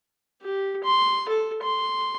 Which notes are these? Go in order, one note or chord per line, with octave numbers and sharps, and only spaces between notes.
G4
C6
A4
C6